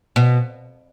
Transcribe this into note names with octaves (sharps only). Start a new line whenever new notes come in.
B2